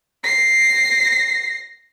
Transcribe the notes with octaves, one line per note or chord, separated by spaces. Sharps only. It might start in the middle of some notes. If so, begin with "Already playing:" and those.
A#6 C7